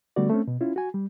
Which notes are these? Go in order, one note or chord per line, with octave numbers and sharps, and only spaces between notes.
D3 G3 A3 B3 F#4 D5
A3 C4 C#4
B2
C#4 E4 F4
F#4 G#5
G3